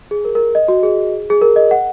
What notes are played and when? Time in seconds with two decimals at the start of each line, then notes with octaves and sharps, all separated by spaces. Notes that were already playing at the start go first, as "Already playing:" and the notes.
0.11 G#4
0.25 A#4
0.35 A#4
0.55 D#5
0.68 F#4
0.83 G#4
1.30 G#4
1.42 A#4
1.56 D#5
1.71 F#5